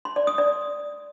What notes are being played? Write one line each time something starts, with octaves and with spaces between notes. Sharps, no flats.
C6
D5
D#6
D5